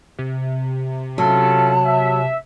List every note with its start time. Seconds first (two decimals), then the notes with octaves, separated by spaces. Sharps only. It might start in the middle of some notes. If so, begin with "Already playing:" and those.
0.19 C3
1.18 F#3 C#4 F4 A4 A5
1.86 E5